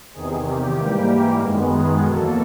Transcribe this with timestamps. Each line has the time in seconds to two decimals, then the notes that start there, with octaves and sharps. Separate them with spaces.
0.14 E2 C3 D#3 G#4
0.46 G4
0.77 G#2 E3 G3 A#3
1.40 F#2 D#3 G#3 B3
1.72 G#4
2.03 E2 B2 F#3 A#3 A4